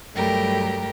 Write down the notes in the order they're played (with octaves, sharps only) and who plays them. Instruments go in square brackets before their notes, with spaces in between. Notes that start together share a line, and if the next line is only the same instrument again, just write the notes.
[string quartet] G2 F#3 G3 A3 G4 A#4